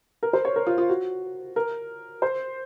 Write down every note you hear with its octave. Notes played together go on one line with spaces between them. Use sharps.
A#4
C5
C#5
A#4
F4
F4
F#4
A#4
C5